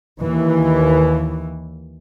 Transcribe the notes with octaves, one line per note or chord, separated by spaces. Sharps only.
D#2 E3